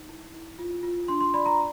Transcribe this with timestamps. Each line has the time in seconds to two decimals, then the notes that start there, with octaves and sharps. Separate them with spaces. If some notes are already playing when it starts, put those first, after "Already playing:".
Already playing: D#4
0.09 E4
0.34 E4
0.58 F4
0.83 F4
1.08 D4 C6
1.21 C6
1.34 D5 B5
1.46 A#5